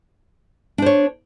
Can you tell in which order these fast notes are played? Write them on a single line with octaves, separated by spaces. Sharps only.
D4 C5 C#5